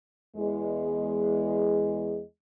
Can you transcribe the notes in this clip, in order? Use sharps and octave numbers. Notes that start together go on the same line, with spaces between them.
E2 G#3